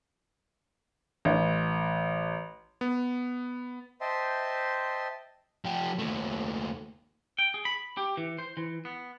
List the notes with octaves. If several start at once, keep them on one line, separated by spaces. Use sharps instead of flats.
A1
B3
C5 D#5 E5 G5 A5 C6
F3 G4
D#2 A3
G5
G#4
B5
G4
E3
C5
E3
B3